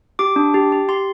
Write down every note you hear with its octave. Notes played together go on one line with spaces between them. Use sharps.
G4 D6
D4
G4
G4
G4 C6